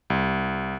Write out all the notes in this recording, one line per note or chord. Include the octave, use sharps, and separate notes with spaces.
C2